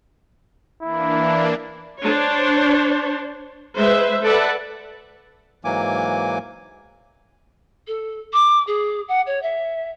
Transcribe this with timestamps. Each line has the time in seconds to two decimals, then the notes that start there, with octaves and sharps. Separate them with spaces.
0.82 E3 A#3 D4 E4
2.02 D4 C5 C#5
3.78 G#3 B4 C5 E5
4.22 A4 B4 D5 E5 F#5 A5
5.65 G#2 E3 F#3 A#3 G#5 D6
7.87 A4
8.33 D6
8.67 G#4
9.08 F#5
9.26 C#5
9.42 E5